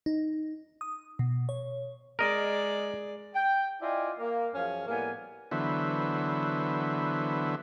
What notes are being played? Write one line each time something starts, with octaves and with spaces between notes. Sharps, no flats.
D#4
D#6
B2
C#5
G#3 A#4 D5 D#5
G5
E4 F4 D5 D#5 G5 G#5
A#3
F#2 F3 C#4 G#4 F5
A2 G3 A#3 B3 F5 G#5
D3 E3 F#3 B3 C5 E5